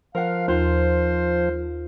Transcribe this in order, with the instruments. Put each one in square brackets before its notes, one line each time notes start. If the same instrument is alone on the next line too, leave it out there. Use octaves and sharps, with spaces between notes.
[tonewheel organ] F3 [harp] A#4 F#5 [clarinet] F5
[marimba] D#2 [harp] F4 [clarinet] C5